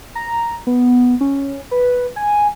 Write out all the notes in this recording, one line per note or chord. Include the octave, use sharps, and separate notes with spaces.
A#5
B3
C#4
B4
G#5